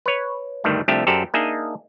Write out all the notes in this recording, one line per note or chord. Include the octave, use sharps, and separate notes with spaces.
B4 C#5
D2 G2 D#3 G3 A3
C2 F3 A3 D4 G4 E5
F#2 G4 A4 C5 D5 A#5
A#3 D4 D#4 G#4 D#5 E5